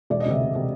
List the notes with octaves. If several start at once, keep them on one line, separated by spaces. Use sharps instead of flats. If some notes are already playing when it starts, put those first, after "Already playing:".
E1 D5
D#5
D2 C3 E5
E1
C3